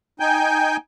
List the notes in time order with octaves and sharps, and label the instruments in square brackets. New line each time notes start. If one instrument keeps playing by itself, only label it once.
[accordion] D#4 G5 G#5 G6